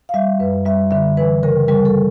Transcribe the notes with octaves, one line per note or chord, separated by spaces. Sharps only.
F5
G3 E5
F#2 B4
G3 E5
D3 E5
E3 B4
C#3 A#4
G3 A#4
A4